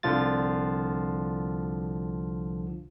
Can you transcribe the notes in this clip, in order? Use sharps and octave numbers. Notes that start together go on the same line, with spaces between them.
C2 D3 F3 F4 A6